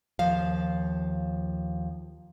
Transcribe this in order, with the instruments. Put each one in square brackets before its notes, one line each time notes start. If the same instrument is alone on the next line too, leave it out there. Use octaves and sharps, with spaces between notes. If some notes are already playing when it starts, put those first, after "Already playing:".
[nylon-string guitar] D#2 F3 F5